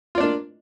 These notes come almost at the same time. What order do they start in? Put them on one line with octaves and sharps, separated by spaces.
F4 D5 D4 A#3